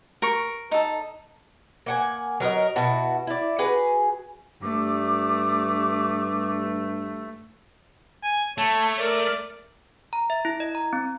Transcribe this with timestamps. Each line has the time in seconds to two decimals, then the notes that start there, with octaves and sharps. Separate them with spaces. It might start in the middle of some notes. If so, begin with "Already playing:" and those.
0.22 A#4 C#6
0.71 D#4 A4
1.86 A#3 F#5 G#5
2.40 F#3 A#4 B4 D#5
2.76 B2 E4 F#4 A5
3.27 E4 D5
3.59 F#4 G#4 B4 G#5
4.62 G2 A3 D6
8.23 G#5
8.58 A3 C#5 A5
8.99 A#4 D5
10.13 A#5
10.30 E5
10.45 E4
10.60 D#5
10.75 A#5
10.93 C4